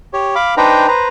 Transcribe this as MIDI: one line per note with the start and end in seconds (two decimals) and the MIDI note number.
0.13 0.35 67
0.13 0.35 73
0.35 0.55 77
0.35 0.55 83
0.35 0.55 86
0.57 0.87 62
0.57 0.87 63
0.57 0.87 71
0.57 0.87 72
0.57 0.87 79
0.57 0.87 82
0.88 1.08 71
0.88 1.08 72
0.88 1.08 82